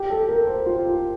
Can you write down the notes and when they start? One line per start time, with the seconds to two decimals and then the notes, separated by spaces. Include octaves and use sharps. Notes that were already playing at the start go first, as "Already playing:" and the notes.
Already playing: G4
0.10 A4
0.29 A#4
0.47 C5
0.66 F4